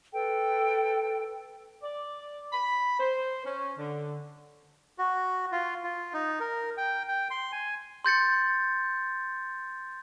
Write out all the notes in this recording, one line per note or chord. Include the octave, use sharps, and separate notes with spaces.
A4 B4 G5
D5
B5
C5
C#4
D3
F#4
F4
F4
D#4
A#4
G5
G5
C6
G#5
C6 G6 A6 C#7